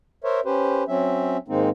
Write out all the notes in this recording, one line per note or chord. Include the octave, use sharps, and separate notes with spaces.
A#4 C5 C#5 E5
C#4 G4 B4 C5
F#3 C4 C#4 E5
G#2 D#3 G#3 A#3 C4 D#4